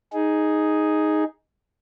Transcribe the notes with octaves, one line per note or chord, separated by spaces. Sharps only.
D#4 G#4